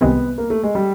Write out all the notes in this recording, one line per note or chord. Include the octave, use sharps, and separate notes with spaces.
C2 C3 D#3 G#3 B3 C4
A#3
A3
G#3
G3